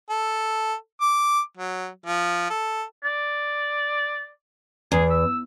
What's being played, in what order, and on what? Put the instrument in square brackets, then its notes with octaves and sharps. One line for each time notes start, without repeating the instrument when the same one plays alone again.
[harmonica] A4
D6
F#3
F3
A4
[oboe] D5
[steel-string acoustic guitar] E2 [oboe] G#4
[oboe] E6